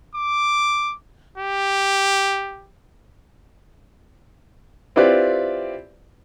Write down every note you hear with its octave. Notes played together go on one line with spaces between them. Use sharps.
D6
G4
C4 E4 F4 G4 B4 D5